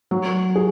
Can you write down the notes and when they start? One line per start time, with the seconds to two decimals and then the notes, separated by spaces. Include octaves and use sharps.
0.11 F#3
0.56 G#4